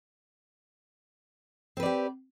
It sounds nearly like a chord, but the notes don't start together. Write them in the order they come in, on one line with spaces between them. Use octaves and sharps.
C4 B4 D5 G4